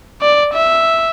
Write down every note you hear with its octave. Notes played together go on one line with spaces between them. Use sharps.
D5
E5